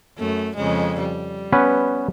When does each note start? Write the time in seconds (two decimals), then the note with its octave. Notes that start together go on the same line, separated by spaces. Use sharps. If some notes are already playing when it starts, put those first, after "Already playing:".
0.19 F#2 A3
0.56 F2 C#3 G#3
1.00 G3
1.52 B3 C#4 B4